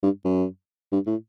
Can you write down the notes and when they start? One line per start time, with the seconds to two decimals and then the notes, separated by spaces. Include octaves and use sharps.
0.03 G2
0.25 F#2
0.92 G2
1.06 A2